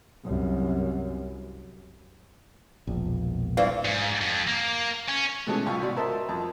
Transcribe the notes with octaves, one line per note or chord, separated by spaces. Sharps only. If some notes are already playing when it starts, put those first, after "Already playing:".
C2 F#2
E1 A#1
G2 E3 C4 F5
G#2
F2
A#3
C#4
B2 E3 G#3 A3 C#4 A4
C2 F4 C#6
G#1 B2 F#4 D5
A#4 C5 D#5 E5 A5
F2